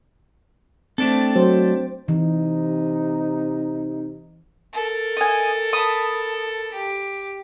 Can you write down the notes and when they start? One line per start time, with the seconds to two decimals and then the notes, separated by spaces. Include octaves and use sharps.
0.98 A3 C4 D4 A4
1.36 F#3 C5
2.08 C3 E3 D#4
4.73 A4 A#4
5.17 D#5 G#5
5.73 A5 B5 D#6
6.73 G4